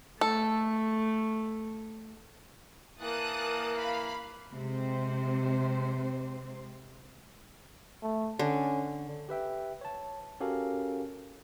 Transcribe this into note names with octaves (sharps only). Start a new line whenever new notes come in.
A3 A4
E3 A#3 A5 D#6 F#6
F5 B5
C3 G#3 C4 C5
A3
D3 C#4
G4 B4 E5 G5
C#5 A5
C#4 F#4 G4 A4 A#4 F5